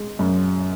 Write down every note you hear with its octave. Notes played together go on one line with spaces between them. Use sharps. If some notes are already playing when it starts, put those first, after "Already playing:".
Already playing: G#3
F#2